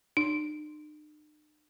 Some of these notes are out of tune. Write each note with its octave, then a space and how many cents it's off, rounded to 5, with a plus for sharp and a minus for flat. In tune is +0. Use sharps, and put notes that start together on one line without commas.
D#4 -45